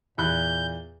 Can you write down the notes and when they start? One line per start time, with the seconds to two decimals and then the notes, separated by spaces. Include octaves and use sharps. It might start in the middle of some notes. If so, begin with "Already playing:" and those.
0.18 E2 A#2 B5 F#6 G6